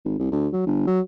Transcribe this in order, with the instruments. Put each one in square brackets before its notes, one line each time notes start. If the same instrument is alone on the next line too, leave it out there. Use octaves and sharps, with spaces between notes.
[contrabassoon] G#1
C2
D2
F#3
G1
F#3